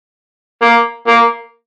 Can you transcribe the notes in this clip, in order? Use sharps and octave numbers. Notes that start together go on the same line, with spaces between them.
A#3
A#3